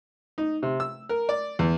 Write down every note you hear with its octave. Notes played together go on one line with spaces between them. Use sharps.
D#4
C3
E6
A#4
D5
E2